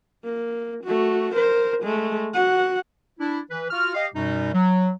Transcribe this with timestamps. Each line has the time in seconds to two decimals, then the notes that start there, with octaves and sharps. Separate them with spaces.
0.25 A#3
0.84 A3 F#4
1.34 A#4 C5
1.83 G#3 A3
2.34 F#4 F#5
3.19 D4 E4
3.51 E3 B4
3.70 F4 F#4 F6
3.95 G4 D#5 F5
4.14 F#2 B2 G3 D#4
4.54 F#3